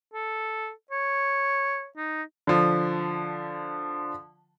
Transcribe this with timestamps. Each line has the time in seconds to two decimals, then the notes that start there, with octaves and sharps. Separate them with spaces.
0.13 A4
0.91 C#5
1.97 D#4
2.47 D3 F3